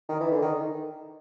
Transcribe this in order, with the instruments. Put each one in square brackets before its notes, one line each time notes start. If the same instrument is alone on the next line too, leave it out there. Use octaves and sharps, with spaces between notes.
[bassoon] D#3
E3
D3
D#3